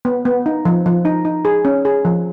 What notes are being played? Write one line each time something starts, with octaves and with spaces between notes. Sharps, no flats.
B3
B3
D#4
F3
F3
D#4
D#4
G#4
C#4
G#4
F3